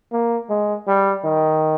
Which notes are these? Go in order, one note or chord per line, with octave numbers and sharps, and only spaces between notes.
A#3
G#3
G3
D#3